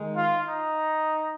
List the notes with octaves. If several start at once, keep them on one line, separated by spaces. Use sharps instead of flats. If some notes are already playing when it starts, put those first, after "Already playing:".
Already playing: D#3 G#3 D#4
F4
D#4